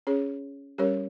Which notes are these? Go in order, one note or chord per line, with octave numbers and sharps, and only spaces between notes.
C#4 G#4 C#5
G3 C#4 G4 A#4 C#5